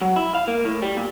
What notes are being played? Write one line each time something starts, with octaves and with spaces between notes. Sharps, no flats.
F#3
E4
F5
A#3
A2
G3
A#2